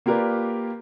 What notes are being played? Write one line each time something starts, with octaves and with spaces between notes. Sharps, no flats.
A#3 F4 G4 A#4 B4 D5